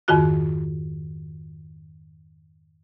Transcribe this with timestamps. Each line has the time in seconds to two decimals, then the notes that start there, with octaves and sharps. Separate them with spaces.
0.08 F2 G#2 D#3 F4 F#4 F#6